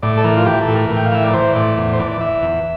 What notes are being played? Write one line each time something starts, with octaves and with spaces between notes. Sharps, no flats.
A2 D5
A4
E3 A#4
F4
E3 G4
A4
A2
A#4
A2
G5
F5
E3 E5
D5
E3 C5
A2 D5
E2
C5
E3 D5
D5
E3 E5
E2